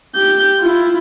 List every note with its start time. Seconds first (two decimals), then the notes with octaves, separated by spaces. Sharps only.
0.15 G4 G6
0.60 E4 F4